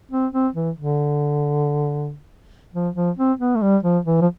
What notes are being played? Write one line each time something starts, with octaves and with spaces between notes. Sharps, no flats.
C4
C4
E3
D3
F3
F3
C4
B3
A3
G3
F3
E3
F3